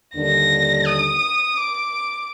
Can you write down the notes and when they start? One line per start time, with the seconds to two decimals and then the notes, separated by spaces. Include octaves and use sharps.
0.15 D#2 D3 G3 A#3 D4 A#6
0.86 D#6
1.57 D6